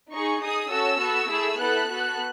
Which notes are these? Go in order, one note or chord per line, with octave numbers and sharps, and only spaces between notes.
D#4 G#4 C#6
D#4 G#4 D#6
C#4 F#4 A4 E6
B3 F#4 A4
A3 E4 G#4
B3 E4 A4 F#6
B3 F#4 A4